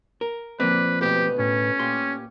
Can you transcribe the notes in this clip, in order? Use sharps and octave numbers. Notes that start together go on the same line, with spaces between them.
A#4
F3 A#3 C4 B4 D5
D2 B2 G4 B4
A2 C#4
A#2 G4 G#5 C6